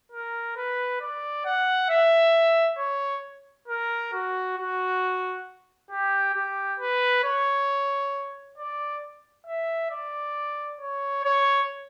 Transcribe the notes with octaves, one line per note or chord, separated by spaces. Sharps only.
A#4
B4
D5
F#5
E5
C#5
A#4
F#4
F#4
G4
G4
B4
C#5
D5
E5
D5
C#5
C#5